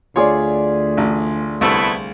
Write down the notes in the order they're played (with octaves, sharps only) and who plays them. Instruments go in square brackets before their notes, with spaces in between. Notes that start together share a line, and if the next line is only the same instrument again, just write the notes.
[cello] D2 [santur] F4 G#4 D5 [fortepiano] C#5
[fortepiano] A1
[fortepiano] C2 [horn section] A3 B3 E4